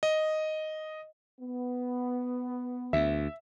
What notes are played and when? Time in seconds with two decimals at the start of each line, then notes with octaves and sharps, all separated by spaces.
0.03 D#5
1.40 B3
2.93 D2 E5